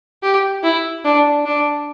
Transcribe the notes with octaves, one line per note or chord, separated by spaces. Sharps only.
G4
E4
D4
D4